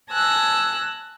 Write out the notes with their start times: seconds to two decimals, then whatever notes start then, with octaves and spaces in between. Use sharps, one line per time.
0.10 G#5 A5 E6 F#6 A#6